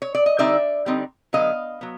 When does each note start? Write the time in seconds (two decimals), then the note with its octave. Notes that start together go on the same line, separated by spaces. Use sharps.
0.02 C#5
0.15 D5
0.26 D#5
0.38 D3 G3 C4 D#4 D5 E5
0.86 D3 G3 C4 D#4
1.33 D3 F#3 B3 D#5 F5
1.81 F#3 B3